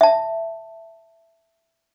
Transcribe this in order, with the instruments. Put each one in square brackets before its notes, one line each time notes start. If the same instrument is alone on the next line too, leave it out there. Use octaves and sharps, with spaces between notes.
[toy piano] E5 A5